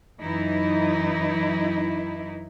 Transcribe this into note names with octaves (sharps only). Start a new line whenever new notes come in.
F#2 E3 D#4 E4